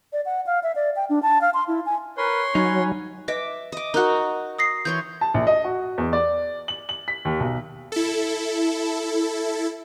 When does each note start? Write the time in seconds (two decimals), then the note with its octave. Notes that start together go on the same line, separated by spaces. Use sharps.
0.13 D5
0.26 F#5
0.46 F5
0.63 E5
0.76 D5
0.96 G5
1.10 D4
1.23 A5
1.41 F5
1.54 C6
1.68 E4
1.86 G#5
2.17 A#4 B4 C#5 C6
2.55 F#3 C#4 D#4 B4 G#5
3.28 B4 D#5 E5 D6
3.72 D#5 D6
3.94 D#4 F#4 A#4 F#6
4.59 D#6 A#6 C7
4.85 E3 C#5 C6 G6
5.21 A5
5.34 A#1
5.47 D#5
5.64 F#4
5.98 E2
6.13 D5
6.68 F#7
6.89 F#7
7.08 B6
7.25 D#2
7.40 B1
7.92 E4 A4